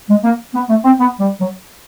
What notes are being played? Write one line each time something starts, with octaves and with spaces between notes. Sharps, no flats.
G#3
A#3
B3
A3
C4
B3
G3
F#3